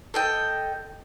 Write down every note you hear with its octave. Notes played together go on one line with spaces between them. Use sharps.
A4 D#5 G5